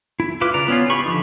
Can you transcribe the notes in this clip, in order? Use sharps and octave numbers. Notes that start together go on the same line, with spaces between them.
E4
E4 F4 B4 D6
C#3 D5 A#5
B3 C#4 F4
G4 B5 C#6
D3 F3 D#4